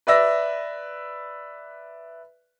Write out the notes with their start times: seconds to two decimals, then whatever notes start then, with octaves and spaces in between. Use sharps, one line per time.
0.07 B4 D5 E5 A#6